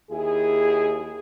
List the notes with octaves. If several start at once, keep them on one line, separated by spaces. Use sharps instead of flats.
D#2 E4 G#4